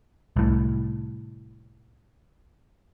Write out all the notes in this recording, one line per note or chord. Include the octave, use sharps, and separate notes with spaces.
C2 A2